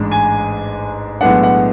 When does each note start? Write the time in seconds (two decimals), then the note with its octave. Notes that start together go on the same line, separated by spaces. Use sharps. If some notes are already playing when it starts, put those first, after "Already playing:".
Already playing: A1 G#2 G#3 D4
0.12 G#5
1.21 B1 A2 G#3 B3 D4 F#5
1.43 F#5